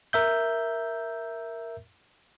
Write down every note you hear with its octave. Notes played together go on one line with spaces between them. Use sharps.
A#4 E5 G6